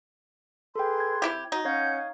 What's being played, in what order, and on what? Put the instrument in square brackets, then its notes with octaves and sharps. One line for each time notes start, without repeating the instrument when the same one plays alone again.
[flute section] G#4 B4 C6 [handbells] A4 G5
[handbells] G#6
[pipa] C3 E4 G4
[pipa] D#4 [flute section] F#4
[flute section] C#4 F#5 G6 [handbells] C#5 F5 G#6